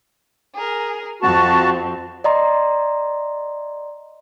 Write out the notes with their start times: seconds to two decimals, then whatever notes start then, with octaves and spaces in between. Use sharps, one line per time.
0.54 G#4 A#4
1.22 F2 C4 F#4 A5
2.24 D5 D#5 A#5 C6